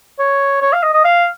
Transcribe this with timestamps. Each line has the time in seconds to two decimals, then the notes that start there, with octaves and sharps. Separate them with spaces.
0.19 C#5
0.62 C#5
0.73 F5
0.83 D#5
0.94 D#5
1.05 F5